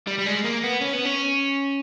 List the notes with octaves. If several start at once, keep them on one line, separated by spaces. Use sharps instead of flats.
G3
G3
G#3
A#3
B3
C#4
B3
C#4